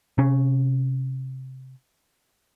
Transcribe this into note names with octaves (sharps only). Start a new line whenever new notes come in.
C3 C#4